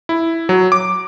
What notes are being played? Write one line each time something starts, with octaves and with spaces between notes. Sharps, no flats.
E4
F#3
D6